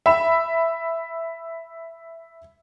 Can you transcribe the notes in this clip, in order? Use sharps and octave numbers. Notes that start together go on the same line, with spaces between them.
E5 B5 E7